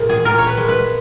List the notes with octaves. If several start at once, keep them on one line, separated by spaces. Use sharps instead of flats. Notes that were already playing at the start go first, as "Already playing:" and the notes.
Already playing: A#2 G#3
G#4
A#2 A#4
C#5
B4
G#3
B4